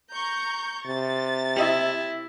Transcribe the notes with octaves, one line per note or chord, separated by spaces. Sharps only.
A#5 C#6 G6
C3 A6
E4 G4 D#5 E5